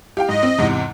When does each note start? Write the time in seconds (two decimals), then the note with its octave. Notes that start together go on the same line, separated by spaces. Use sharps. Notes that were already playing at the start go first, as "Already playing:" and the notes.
0.17 G4 F5 G5
0.29 G#2 D#5
0.43 C4
0.58 E2 G#2 C3